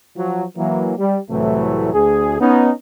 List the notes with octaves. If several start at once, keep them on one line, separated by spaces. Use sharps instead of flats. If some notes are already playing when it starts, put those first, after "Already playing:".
F3 F#3
E3 F#3 A#3
G3
C2 A2 C3 E3 F#3 A3
D2 G#4
B3 C#4 D#4